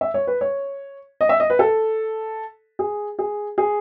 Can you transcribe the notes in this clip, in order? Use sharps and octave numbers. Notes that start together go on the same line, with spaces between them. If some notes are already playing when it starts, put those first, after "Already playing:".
E5
C#5
B4
C#5
D#5
E5
D#5
B4
A4
G#4
G#4
G#4